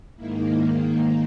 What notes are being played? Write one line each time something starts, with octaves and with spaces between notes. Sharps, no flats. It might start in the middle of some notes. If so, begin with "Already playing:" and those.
G#2 D#3 A#3 E4
E4
D#4